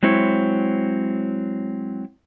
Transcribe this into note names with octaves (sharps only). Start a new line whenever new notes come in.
F#3 G#3 C4 E4 C#5